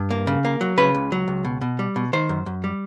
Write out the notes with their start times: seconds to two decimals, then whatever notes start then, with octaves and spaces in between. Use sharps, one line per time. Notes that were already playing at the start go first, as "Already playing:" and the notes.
Already playing: G2
0.10 A#3
0.27 C#3
0.45 A#3
0.61 F#3
0.77 C#3 B4
0.94 C#2
1.12 F#3
1.28 C#2
1.45 B2
1.61 B2
1.79 G3
1.96 B2
2.13 D#3 C5
2.29 F#2
2.46 F#2
2.64 G3